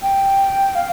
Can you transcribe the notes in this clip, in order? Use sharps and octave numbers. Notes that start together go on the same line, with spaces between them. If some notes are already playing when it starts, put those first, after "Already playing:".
G5
F5